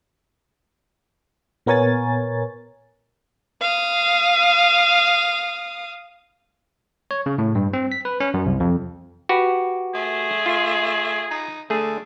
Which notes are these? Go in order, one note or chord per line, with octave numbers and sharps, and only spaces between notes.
A#2 B3 A#4 C#5 G#5 A6
F5 D#6
C#5
C#3
A2
G2
C4
B6
B4
C#4
F#2
C2
F2
F#4 G4 B4
A3 G#4
F4
D#4
D3 A3 G#4